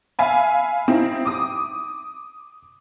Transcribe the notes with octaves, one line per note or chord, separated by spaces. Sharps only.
E5 F5 G#5 B5
C4 D#4 E4
D6 D#6